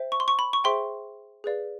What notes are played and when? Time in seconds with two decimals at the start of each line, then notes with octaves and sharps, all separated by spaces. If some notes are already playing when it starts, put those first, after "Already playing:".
Already playing: C5 E5 G5
0.12 C#6
0.20 C6
0.28 C#6
0.39 B5
0.53 C#6
0.64 G#4 C5 E5 G5 C6
1.44 G#4 B4 D5 F5